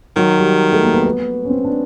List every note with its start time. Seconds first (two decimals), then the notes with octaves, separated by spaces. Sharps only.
0.16 D#3 F#3
0.39 G3
0.72 A3
0.83 A#3
0.94 B3
1.05 B3
1.45 C#4
1.50 C4
1.64 D4